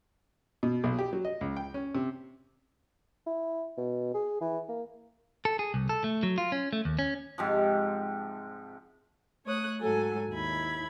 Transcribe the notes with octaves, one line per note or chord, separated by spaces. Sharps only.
B2
B1
G4
F#3
D#5
C#2
G5
C#4
C3
E4
B2
G#4
E3
A#3
A4
G#4
C2
A4
A3
F#3
F4
C#4
A3
D#2
C#4
G#2 C3 F3
A3 C#5 D#6 F#6
G#2 F#3 A4 G#5
D#2 E4 B5 G#6